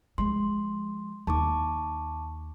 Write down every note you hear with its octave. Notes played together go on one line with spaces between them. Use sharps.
F3 G#3 C6
D#2 A5 C#6 D6